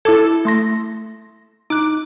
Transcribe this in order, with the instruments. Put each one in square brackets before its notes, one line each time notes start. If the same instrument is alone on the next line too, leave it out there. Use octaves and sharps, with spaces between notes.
[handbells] E4 D6 G#6 [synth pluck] A4
[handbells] A3 C6 A#6
[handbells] D#4 F#6 [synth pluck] D6